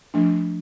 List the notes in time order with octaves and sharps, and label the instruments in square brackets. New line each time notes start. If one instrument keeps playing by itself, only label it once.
[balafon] F3 A3 D4